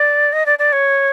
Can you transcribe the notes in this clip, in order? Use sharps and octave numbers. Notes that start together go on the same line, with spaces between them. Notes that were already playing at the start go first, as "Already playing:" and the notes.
Already playing: D5
D#5
D5
D5
C#5